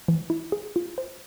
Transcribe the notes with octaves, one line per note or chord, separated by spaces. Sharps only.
E3
E4
G#4
F4
C5